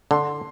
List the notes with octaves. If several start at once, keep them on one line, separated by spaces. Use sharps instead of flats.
D3 C6